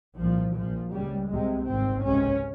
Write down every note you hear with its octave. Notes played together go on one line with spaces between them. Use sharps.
C2 A#2 F3
A#1 A#2 F3
C#2 C#3 G3
C2 C3 G#3
G#1 G#2 C4
C#2 C3 C#4